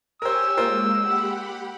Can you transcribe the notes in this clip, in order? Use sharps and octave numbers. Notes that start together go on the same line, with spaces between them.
G4 A#4 C5 C#5 G#5 E6
G#3 A#3 F4 A#4 C5
G4 F#5 B5